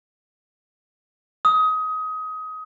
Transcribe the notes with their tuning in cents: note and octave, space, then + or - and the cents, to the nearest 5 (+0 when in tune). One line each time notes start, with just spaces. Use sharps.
D#6 +20